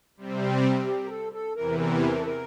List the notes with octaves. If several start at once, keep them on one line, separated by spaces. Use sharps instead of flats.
C3 G3 C4
G4
A#4
A4
A4
E2 C3 E3 A#4
A#4
A#4
A4
A#4